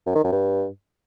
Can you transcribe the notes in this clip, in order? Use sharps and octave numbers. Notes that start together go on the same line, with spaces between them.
F#2
D#3
F#2
G2